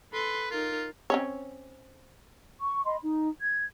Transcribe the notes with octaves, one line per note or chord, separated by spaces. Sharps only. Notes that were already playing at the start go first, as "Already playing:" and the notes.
A4 B4 C6
D#4 F4 A#4
C4 C#4 C#5
C#6
D#5 B5 C6
D#4
G#6